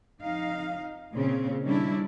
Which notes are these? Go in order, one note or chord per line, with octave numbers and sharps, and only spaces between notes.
F2 D#4 F5
A#2 C#3 C4 C#4
D#3 G3 C#4 D4 E4